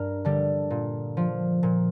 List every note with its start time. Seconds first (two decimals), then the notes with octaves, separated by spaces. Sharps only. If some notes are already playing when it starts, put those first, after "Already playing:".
Already playing: G2 A#4
0.25 D3 G3
0.71 A#2
1.17 F3
1.63 A#2